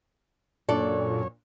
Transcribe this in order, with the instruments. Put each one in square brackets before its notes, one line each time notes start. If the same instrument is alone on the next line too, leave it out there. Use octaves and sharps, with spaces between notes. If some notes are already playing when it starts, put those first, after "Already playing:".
[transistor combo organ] F#2 C#5 [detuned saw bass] A#2 [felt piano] D4 [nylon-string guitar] A4 D5